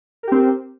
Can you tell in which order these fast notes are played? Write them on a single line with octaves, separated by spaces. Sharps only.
A#4 G4 C4